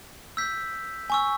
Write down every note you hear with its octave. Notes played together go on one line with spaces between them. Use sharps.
E6 G6 B6
G#5 C#6 E6